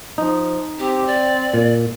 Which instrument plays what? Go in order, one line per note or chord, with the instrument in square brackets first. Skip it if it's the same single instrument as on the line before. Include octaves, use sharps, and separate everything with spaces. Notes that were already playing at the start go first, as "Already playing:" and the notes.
[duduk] F3 [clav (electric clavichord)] D#4
[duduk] C4 [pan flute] G4
[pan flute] D5
[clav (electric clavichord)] A#2